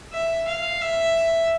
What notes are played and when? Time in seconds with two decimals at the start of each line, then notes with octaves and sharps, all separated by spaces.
0.13 E5
0.48 F5
0.81 E5